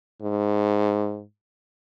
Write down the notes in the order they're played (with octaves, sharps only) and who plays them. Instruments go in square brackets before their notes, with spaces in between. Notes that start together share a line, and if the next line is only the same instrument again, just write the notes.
[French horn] G#2